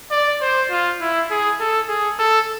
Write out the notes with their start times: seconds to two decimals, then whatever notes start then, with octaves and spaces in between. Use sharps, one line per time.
0.11 D5
0.42 C5
0.71 F4
1.01 E4
1.31 G#4
1.60 A4
1.89 G#4
2.19 A4